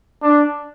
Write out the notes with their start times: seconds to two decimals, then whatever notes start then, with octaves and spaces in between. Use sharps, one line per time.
0.23 D4